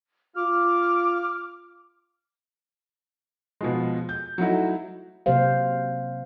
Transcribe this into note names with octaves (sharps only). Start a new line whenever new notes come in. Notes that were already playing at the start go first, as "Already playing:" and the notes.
F4 D6 F6
B2 F3 G#3
G6
F#3 A3 D#4 E4 F#4
C3 F#3 A#3 G4 C5 F5